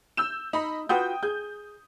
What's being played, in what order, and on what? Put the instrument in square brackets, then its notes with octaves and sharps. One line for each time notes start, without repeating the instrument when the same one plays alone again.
[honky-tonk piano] E6 G6 E7
[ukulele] D#4 [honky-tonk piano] D#5 B5
[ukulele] F4 F#4 B4 [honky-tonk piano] G5 D#6 G6
[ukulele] G#4 [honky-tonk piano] G6